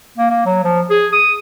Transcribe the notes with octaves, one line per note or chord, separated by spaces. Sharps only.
A#3
A#3
F#3
F3
G#4
D#6